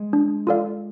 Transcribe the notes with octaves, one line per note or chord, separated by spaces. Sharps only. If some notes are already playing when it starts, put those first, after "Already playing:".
Already playing: G#3
D4
F4 A4 D5 F5